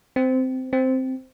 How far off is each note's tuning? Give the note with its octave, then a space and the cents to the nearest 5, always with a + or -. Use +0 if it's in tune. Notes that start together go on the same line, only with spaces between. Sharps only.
C4 -15
C4 -5